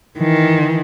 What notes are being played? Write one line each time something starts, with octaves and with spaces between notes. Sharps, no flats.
D#3 E3